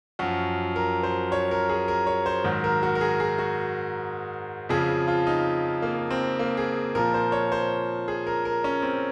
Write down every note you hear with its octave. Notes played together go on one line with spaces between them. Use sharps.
F#2 F3 F#4
A#4
C5
C#5
A#4
G#4
A#4
C#5
C5
G#2 D#3 F#3
A#4
F#4
A#4
G#4
G#4
F#4
F2 C#3 F3 G#4
F4
D#4
A#3
C4
A#3
G#4
A#2 F3 A#4
C5
C#5
C5
G#4
A#4
A#4
C#4
C4